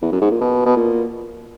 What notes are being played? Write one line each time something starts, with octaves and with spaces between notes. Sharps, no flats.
E2
F#2
G#2
A#2
B2
B2
A#2